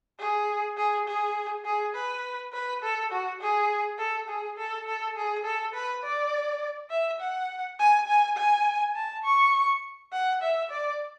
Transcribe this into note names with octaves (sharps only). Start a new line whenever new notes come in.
G#4
G#4
G#4
G#4
B4
B4
A4
F#4
G#4
A4
G#4
A4
A4
G#4
A4
B4
D5
E5
F#5
G#5
G#5
G#5
A5
C#6
F#5
E5
D5